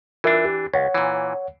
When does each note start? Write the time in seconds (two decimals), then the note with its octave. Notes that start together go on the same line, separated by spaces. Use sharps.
0.24 E3 D4 F4 A#4 E5
0.45 G4
0.74 C#2 C#5 F#5
0.94 A#2 E3